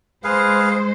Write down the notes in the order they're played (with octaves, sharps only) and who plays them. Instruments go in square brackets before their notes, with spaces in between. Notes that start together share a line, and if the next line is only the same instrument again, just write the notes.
[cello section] G#3 C5 [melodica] G#4 B4 F5